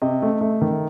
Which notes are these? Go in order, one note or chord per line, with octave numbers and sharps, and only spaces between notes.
C3 D#5
A3
A3
D#3